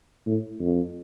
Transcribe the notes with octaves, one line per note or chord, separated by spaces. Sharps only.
A2
F2